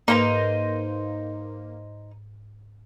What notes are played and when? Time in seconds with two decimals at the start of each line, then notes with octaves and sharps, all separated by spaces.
0.08 G#2 A#3 D#4 B4 C5 A#5